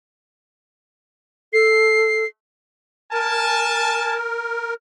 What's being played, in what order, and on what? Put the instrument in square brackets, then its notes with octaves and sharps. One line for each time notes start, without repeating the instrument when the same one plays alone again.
[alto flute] A4 [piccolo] C7
[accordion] A#4 [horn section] G#5 A5